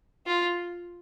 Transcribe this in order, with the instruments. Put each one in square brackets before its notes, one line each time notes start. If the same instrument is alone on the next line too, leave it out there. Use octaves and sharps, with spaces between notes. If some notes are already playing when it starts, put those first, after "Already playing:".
[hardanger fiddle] F4